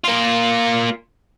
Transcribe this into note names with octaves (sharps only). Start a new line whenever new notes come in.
A#3 F4